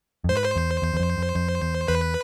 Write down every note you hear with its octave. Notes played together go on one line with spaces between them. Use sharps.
F2
G#2 C5
B4
C5
E2
E2
E2
F2
F2
F2
E2
E2 B4